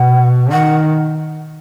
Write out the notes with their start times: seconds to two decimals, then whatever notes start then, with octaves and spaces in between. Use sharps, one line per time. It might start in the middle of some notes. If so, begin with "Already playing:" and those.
Already playing: B2 F#5
0.51 D#3 F#5